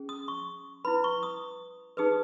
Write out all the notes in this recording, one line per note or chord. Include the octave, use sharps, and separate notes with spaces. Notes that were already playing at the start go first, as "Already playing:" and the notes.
Already playing: C#4 G#4
D#6
C#6
E4 B4 B5
C#6
D#6
D#4 G#4 B4 D#6